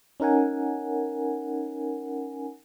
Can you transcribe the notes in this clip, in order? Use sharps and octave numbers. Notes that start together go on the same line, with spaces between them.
C#4 D#4 A#4 F#5 G#5